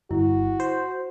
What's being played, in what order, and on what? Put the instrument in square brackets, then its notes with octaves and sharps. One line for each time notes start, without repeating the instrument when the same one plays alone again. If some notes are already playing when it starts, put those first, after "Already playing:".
[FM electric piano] G1 [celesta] E4 [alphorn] F#4
[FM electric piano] C5